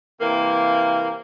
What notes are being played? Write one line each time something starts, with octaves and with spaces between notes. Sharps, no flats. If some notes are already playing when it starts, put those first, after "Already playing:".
C3 E3 A#3